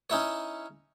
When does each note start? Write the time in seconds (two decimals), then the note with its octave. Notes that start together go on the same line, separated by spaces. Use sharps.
0.10 C#4 D#4 E4 C#5